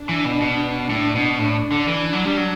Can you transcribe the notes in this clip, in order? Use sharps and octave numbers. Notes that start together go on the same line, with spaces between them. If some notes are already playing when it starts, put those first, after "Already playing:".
Already playing: D4
E3
B2
B2 D4
A2 D4
B2
A2
D3
E3
F#3
G3
F#3